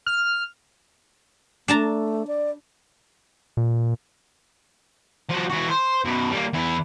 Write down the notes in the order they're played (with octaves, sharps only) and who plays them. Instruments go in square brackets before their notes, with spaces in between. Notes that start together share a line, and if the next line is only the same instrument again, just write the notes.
[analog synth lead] F6
[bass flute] A3 [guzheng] D4 A5 A#5
[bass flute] D5
[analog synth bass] A#2
[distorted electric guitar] F3 F#4
E3 F#4
C5
F#2 B2
G3 A#3
E2 E4